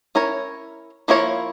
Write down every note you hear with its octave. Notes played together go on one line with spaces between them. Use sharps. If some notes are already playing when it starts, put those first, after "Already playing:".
C#4 E4 A#4 C#5
F3 A#3 E4 A#4 C#5